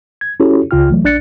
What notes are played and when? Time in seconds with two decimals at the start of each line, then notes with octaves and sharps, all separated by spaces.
0.21 G#6
0.40 C#4 E4 F#4 G4 A4 C#5
0.71 C#2 C#3 F4 G5 F6
0.90 E3 F#3 A3
1.04 A#1 D4 D5 F#6 A6 C#7